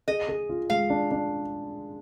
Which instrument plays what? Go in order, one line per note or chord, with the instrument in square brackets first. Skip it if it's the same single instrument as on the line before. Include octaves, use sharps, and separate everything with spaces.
[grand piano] G#4 [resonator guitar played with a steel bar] D#5
[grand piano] G#4
F4
[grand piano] G#3 [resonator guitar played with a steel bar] F5
[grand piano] D4
D4